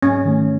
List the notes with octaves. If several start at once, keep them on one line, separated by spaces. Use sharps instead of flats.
G#2 C#4
D#3 A3